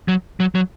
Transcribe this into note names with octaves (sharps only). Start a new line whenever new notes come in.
F#3
F#3
F#3